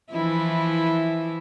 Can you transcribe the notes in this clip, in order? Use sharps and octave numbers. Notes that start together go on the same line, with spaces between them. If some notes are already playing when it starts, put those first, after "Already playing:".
E3 F3 E4